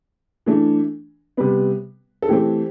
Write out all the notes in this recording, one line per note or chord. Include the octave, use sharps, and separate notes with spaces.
E3 A3 D4
C3 G3 B3 B4
A4
E3 A3 C4 G4